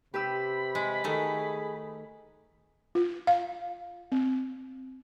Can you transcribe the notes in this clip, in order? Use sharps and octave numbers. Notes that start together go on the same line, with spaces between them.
C3 G4 B4 B5 E6
G#3
D#3 A3 G#4
F4
F5
C4